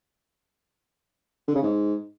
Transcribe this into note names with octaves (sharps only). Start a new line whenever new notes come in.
D3
C#3
G#2